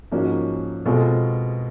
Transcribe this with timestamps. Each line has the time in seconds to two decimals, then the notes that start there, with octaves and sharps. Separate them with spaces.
0.11 G#2 F3 A#3 C#4 F#4
0.86 B2 G#3 C4 F4 A4